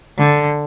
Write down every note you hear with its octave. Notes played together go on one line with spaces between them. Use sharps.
D3